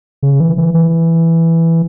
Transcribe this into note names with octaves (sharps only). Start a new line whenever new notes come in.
C#3
E3
E3
E3